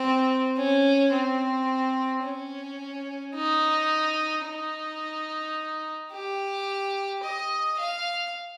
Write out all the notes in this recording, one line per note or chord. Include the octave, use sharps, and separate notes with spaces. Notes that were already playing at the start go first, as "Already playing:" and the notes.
Already playing: C4
C#4
C4
C#4
D#4
D#4
G4
D#5
F5